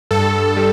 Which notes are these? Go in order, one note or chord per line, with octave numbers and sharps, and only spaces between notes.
G2 A4
G3